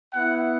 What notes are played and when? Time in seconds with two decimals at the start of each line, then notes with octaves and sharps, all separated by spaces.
0.13 B3 E4 F#5